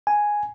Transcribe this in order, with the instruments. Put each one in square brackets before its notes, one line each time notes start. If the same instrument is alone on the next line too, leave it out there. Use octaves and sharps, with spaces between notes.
[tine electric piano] G#5